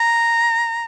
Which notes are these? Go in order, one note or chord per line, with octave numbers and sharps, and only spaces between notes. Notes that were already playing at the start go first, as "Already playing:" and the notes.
Already playing: A#5